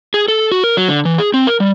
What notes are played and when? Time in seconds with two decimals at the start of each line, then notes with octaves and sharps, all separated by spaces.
0.14 G#4
0.28 A4
0.52 F#4
0.64 A#4
0.77 F#3
0.89 D3
1.05 E3
1.18 G#4
1.34 C4
1.47 A#4
1.60 G3